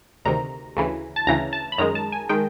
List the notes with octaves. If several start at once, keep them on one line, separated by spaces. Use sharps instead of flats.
D2 C3 D#3 A#5
D2 C#3 E3
A5
D2 C#3 E3 A#5
A5
B5
F#2 D#3 G#3 A#5
A5
G#5
D#3 G#3 G5